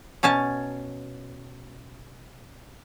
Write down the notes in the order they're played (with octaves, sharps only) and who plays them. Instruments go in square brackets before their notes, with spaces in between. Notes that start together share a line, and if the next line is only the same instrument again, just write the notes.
[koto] B2 C#4 G#5 A5